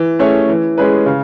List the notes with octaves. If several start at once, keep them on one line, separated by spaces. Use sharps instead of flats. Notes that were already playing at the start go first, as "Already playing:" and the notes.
Already playing: E3
A3 C#4 G#4 C#5
E3
G#3 C#4 G#4 B4
C#3